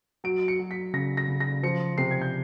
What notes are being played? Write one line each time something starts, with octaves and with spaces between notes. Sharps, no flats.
F#3 D7
C#7
F#3
B6
C#3 A#6
A#6
C#3
A#6
F3 C#7
C3 C7
G#6
G6